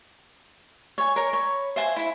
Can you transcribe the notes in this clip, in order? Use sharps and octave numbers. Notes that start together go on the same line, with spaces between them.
C#5 G#5
A#4 C#5
C#5 B5
C5 E5 G#5 C6
E4 B5